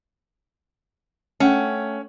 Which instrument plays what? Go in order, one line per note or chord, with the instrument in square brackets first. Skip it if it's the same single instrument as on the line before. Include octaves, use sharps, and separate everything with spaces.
[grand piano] A3 F#5 G5 [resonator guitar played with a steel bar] C#4